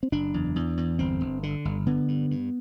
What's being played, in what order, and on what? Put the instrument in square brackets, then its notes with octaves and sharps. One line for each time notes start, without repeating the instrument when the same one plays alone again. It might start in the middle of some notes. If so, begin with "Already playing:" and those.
[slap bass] C4
F#1 D4
E2
E2
E2
G1 C4
G1
D3
G1
D3 B3
G2
G2